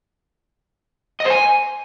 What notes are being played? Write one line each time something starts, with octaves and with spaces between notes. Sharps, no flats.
D#5
C5
G#5